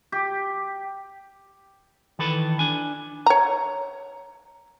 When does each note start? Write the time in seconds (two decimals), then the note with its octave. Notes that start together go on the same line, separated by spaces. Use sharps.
0.12 G4
2.19 D#3 E3 A4 B4
2.59 D4 G#5
3.26 C#5 A#5